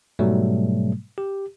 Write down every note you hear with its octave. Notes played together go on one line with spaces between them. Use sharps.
G#2 B2 F#3 G3 A3
G4